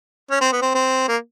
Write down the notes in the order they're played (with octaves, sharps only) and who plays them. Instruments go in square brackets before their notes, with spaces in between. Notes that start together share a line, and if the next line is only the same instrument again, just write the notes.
[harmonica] C#4
C4
B3
C4
C4
A#3